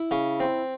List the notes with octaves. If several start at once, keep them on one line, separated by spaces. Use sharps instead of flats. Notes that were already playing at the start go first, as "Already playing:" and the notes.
Already playing: E4
C#3
C4